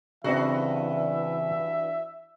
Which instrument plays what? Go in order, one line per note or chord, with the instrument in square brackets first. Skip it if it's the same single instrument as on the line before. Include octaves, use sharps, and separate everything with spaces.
[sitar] G2 D4 F#4 [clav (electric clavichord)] C#3 C4 [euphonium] E3 [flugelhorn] E5